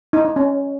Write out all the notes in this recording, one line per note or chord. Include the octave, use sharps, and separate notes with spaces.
D#4
D#4
C#4